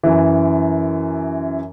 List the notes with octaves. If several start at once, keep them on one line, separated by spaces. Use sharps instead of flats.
F#2 E3